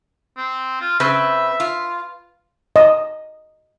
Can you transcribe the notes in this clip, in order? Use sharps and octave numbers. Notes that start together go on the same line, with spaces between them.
C4
F4
C#3 C4 B4 E5
F4
D#5